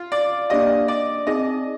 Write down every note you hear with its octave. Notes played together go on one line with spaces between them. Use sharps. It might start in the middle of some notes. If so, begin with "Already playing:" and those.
Already playing: F4
D5
A#3 D4 G4 D5 D#5 F5
D5
C4 D#4 G#4 D#5